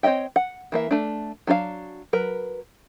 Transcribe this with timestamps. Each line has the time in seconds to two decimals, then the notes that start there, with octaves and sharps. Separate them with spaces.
0.03 C4 C#5 D#5 E5 G5
0.36 F#5
0.72 E3 A#3 E5
0.91 A3 D4
1.47 F#3 D4 A4 F5 A5
2.13 F#3 A#4 B4